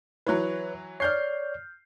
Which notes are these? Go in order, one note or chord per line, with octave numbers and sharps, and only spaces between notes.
E3 F#3 B4 C#5
C#5 D5 F6 G6 C7